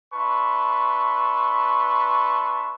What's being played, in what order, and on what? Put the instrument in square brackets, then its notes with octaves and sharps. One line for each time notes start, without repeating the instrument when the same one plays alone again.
[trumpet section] D4 B4 E5 A5 C6 C#6